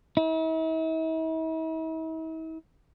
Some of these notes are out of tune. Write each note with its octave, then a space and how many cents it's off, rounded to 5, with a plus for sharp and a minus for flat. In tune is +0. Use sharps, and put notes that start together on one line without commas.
E4 -45